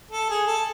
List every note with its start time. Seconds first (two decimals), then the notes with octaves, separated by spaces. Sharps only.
0.11 A4
0.30 G#4
0.47 A4